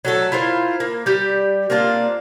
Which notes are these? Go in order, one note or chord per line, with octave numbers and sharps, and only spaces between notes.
F#3 A3 A4
E4 F4 A#4 C5
A#3
G3 G4
A#3 C4 D4 F4